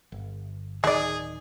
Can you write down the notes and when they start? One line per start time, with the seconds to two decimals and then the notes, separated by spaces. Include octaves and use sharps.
0.12 G1
0.84 D1 D#3 G#3 G#4 D5